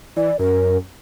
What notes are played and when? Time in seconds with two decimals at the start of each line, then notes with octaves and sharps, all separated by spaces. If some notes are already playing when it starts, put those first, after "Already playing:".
0.16 E3 D5
0.39 F#2 A#4